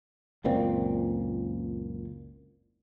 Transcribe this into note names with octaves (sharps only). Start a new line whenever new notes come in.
F#1 C#2 A#2 C4